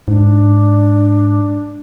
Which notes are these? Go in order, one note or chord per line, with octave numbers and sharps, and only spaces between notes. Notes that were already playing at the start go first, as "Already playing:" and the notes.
G#2 D4